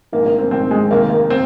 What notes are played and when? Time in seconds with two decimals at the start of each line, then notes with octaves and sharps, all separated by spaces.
0.12 A#1 G#2 D#3 A#3
0.26 A#3
0.38 C4
0.51 A#1 G#2 D#3 C4
0.71 G#3
0.91 F1 D#2 D#3 A#3
1.10 A#3
1.30 C4